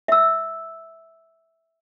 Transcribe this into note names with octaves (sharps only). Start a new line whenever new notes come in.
E5 E6